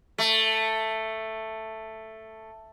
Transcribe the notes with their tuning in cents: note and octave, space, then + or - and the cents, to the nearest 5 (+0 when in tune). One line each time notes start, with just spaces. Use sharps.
A3 +5